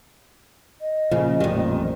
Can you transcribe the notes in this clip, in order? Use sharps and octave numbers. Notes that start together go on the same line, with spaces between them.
D#5
A#2 C#3 F3
A1 F2 A#2 D#3 G3